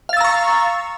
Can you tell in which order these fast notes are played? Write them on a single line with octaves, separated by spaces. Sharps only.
F5 A6 E6 A#5 C#6